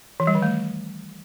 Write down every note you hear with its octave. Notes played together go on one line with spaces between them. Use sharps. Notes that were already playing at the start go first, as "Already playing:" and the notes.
E3
G3
D#3
A3